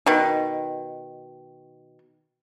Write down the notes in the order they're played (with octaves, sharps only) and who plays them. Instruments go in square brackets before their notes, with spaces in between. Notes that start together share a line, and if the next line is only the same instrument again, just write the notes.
[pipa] B2 D#3